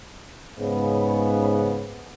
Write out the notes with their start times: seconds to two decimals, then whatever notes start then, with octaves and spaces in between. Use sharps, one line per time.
0.58 G#2 C#3 B3